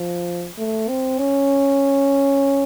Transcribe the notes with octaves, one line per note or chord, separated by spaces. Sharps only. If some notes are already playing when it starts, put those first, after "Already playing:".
Already playing: F3
A3
C4
C#4